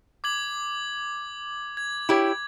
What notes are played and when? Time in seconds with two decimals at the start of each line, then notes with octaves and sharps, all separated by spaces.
0.24 D6 G#6 F#7
1.77 G#6
2.09 E4 G4 C#5